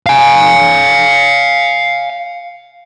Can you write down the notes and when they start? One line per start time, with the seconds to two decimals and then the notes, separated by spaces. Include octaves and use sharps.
0.06 F5 G#5